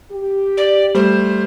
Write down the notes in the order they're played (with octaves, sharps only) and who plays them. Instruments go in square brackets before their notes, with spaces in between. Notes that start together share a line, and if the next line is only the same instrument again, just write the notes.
[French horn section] G4
[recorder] D5
[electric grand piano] G3 A3 [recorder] C5